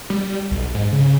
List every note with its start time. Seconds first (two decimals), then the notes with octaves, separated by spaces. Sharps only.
0.10 G3
0.51 B1
0.74 G#2
0.92 C#3